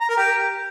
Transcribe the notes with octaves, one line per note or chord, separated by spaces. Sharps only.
A#5
A#4
G4